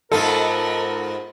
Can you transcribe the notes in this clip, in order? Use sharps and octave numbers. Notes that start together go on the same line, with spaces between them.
G#2 B3 F4 A4 A#4